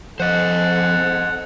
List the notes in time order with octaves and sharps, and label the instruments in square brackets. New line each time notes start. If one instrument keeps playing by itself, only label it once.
[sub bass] F3 [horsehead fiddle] C4 A4 [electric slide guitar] C5 D#5 [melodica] F#5